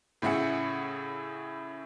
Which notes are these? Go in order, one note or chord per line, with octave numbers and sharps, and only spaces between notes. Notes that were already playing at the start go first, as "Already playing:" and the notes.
A2 C#3 E4 G#4 F#5